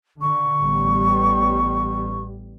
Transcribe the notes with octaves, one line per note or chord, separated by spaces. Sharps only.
D3 C#6
A1 G3 B3